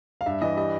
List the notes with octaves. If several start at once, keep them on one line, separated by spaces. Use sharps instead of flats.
F5
G2 E5
E3 D#5
G3 D#5